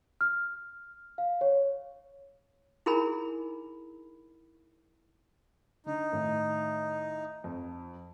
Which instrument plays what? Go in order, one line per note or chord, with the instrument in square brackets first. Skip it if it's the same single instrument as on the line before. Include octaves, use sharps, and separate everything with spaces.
[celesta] F6
F5
C#5
[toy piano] D#4 E4 G#4 A#4 G#5 B5
[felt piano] D3 [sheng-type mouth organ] D#4
[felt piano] A2 D#3
F2